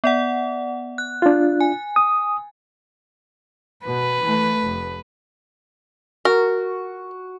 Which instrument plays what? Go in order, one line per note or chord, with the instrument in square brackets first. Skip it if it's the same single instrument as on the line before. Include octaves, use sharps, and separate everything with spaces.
[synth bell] B3 D5 F#5
F#6
[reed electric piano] D4 F4
[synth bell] G#5
[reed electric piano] D#6
[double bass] B2 [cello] B4
[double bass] E3 A3
F1
[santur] F#4 [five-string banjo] A#4